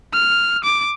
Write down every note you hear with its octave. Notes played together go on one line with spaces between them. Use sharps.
F6
D6